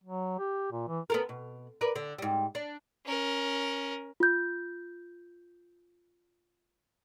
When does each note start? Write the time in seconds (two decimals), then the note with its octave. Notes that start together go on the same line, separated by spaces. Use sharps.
0.04 F#3
0.39 G4
0.72 A#2
0.88 E3
1.10 B3 A4 A#4
1.29 B2
1.81 A#4 B4 D5
1.96 D3
2.18 G#2 G3
2.55 D4
3.06 C#4 A#4
4.20 F4 G6